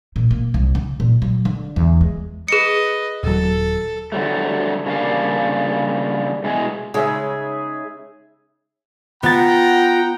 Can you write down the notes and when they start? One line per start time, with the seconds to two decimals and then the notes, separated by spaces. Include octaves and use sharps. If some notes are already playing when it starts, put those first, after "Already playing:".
0.16 A#2
0.31 A#3
0.54 C2
0.75 C#3
1.00 A#2
1.22 F#3
1.45 D3
1.76 E2
2.01 G#3
2.48 G#4 B4 D#5 C#7
3.24 D#1 F#3 A4
4.12 D3 F#3 G3 A3
4.86 C#3 G3 A#3 D4 F5
6.44 B2 G#3 E4 G#4
6.94 C#3 G#3 D#4 G#4 E5
9.23 B3 F4 F#5 G5 A#5 A6